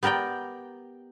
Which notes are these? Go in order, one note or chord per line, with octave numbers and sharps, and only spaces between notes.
B3 G4 A#4 D5 G5